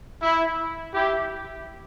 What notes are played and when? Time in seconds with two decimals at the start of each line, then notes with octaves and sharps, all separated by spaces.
0.22 E4
0.94 E4 G4